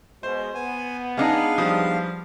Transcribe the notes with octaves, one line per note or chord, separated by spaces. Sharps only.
B2 G#3 C5
B3 G#5
G#3 D4 D#4 F5
F3 G3 D#6